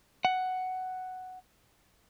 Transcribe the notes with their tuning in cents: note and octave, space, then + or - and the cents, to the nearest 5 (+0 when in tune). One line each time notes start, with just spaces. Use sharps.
F#5 +5